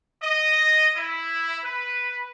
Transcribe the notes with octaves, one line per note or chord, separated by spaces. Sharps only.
D#5
E4
B4